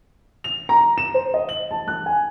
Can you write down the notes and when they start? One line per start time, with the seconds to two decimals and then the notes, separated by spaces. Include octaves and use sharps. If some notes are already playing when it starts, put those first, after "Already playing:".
0.44 F7
0.69 A#5
0.98 E7
1.14 C5
1.34 D#5
1.49 F#7
1.71 A5
1.88 F#6
2.06 G#5